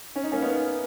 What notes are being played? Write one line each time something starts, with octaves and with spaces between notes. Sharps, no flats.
C#4
D#4
A#3 C#4
B3 D#4